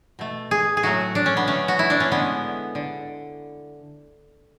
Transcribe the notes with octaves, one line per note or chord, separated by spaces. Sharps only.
B2 A3
G#4
G#4
A2 F#3 A3 F#4
D4
C#4
B3
D3 A3 C#4
F#4
E4
D4
C#4
D3 G#3 B3
D3